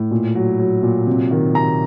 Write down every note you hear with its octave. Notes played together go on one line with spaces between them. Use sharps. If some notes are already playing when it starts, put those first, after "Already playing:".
Already playing: A2
A#2
F#3
F#3
A#2
C3
D#3
C3 A#5